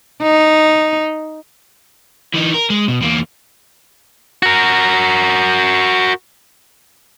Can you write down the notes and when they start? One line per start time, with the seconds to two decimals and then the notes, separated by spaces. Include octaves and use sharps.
0.22 D#4
2.34 E3 D#4
2.54 A#4
2.70 G#3
2.88 B2
3.01 E2 A#3
4.43 F#4 A#4